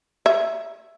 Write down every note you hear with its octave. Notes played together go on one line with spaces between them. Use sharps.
E5